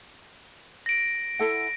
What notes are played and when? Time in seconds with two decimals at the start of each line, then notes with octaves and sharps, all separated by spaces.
0.86 A#6 D7
1.39 E4 A4 F#5